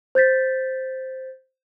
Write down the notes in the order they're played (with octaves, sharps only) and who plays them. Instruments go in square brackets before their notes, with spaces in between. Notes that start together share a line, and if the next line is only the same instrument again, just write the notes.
[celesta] C5 G6 A6 B6